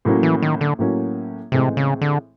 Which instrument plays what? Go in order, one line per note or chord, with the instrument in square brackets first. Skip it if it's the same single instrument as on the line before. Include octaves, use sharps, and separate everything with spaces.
[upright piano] A2 F#3 A#3 C#4
[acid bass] E3
D#3
D3
[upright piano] A2 F#3 A#3 C#4
[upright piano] A2 E3 G#3 C4 [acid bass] C3
[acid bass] C#3
D3